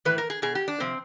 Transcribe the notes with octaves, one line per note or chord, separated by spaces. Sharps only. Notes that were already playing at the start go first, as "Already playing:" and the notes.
A2 E3 B4
A#4
G#4
B2 G#4
G4
D4
C3 F3 C4